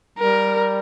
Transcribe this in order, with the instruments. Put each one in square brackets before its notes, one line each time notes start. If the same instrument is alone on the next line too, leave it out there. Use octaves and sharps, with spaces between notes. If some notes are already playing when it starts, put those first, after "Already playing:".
[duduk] G3 [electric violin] A#4